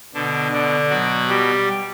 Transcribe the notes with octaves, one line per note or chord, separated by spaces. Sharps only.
B2 D3 D4
D3 D4
B2 F#3 F#4
G3 G4